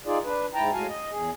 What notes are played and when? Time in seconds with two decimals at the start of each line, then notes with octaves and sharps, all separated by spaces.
0.06 D#4 F4 G#4 D5
0.24 D4 B4
0.54 G#2 E4 G5 A5 A#5
0.73 A2 G#3 F#4 F5 G#5 A5
0.88 D#5
1.11 E2 G#4